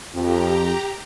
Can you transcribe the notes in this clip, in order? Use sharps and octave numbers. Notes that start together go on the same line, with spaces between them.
F2 G4 A#5